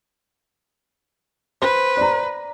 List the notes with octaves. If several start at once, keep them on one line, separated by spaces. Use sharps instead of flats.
B4 C5
D5 A#5